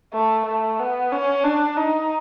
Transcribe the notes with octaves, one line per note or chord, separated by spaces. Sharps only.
A3
A3
B3
C#4
D4
D#4